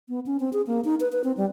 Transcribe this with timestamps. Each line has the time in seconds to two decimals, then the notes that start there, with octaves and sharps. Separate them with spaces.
0.09 B3
0.26 C#4
0.40 C4
0.53 G#4
0.67 A#3
0.85 D#4
1.00 B4
1.12 B4
1.24 C4
1.37 G3